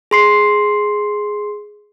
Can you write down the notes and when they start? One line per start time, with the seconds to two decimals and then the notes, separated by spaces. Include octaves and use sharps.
0.11 G#4 C6 C7